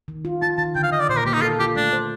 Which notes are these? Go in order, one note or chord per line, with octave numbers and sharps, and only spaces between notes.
D#3
F4
F4 A5
D#3 A5
D3 G5
F5
D3 D#5
D5
A#2 C5
A#4
A#3 G4
D#4
F4 A4
F4 G4
A3 D4
C5